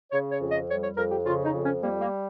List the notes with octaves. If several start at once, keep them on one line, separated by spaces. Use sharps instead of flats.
C#3 C#5
C#5
F2
D#5
G3 C#5
C#5
F2 A#4
G4
C#3 F4
D#4
F2
C#4
G3 A#3
A#3